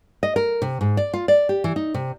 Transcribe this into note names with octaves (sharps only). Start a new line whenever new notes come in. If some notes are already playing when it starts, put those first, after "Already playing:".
D#5
A#4
C3
G#2
D5
F4
D5
G4
E3
D#4
C3